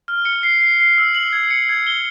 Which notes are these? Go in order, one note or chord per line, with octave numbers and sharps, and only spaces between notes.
F6
C#7
C7
C7
C7
E6
F#7
G#6
C#7
G#6
G7